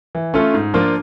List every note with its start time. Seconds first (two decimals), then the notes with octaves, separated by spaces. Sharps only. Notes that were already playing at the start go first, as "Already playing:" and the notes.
0.15 E3
0.34 A3 C#4 F4 A4
0.54 G#2
0.74 F3 A#3 D4 F4